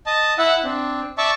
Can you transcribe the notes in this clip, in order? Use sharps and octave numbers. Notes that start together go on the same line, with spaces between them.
D#5 A5
E4 E5 F#5
C4 D4
D5 E5 A5 C#6